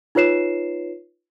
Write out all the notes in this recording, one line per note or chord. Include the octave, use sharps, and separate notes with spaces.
D#4 F4 B4 C#5 C7 E7